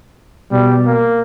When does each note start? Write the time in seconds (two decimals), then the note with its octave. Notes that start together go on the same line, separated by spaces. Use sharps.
0.52 B2 G3
0.86 A#3